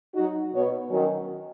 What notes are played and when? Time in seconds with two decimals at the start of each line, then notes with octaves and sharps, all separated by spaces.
0.14 F#3 D#4 F#4
0.53 B2 B3 F#4 C#5
0.90 D#3 F#3 C#4